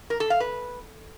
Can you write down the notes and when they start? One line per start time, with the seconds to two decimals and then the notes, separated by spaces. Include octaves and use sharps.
0.10 A#4
0.20 A4
0.30 F5
0.40 B4